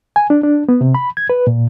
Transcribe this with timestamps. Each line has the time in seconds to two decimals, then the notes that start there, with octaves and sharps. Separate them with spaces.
0.16 G#5
0.30 D4
0.43 D4
0.69 B3
0.81 C3
0.95 B5
1.17 G#6
1.30 B4
1.47 A#2